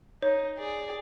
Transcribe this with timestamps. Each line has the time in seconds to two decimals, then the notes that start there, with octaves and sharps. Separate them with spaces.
0.22 D#4 C#5
0.58 G#4 D5